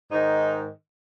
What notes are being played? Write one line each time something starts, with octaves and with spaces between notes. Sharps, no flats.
G#2 D#3 D#4